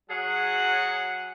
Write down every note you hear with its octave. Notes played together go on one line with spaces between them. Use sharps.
F#3 G#4 F#5